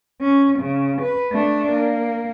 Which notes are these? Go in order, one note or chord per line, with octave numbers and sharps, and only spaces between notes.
C#4
C#3
B4
A3 D4
A#3